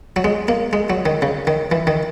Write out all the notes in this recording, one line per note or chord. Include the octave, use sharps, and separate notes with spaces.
F#3
G#3
A#3
G#3
F#3
D#3
C#3
D#3
E3
D#3